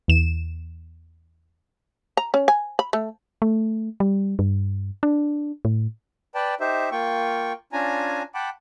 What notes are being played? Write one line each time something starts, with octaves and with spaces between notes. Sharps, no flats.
E2 E7
A#5
C#4
G#5
B5
A3
A3
G3
G2
D4
A2
B4 D5 G5 A5
D#4 G4 C5 E5
A#3 F4 G5 C#6
C#4 D4 F4 G#5 A#5
F#5 G5 A5 B5 D6